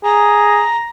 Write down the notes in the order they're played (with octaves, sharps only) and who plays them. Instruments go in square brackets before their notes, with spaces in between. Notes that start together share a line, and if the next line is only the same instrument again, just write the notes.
[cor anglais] G#4 [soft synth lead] A#5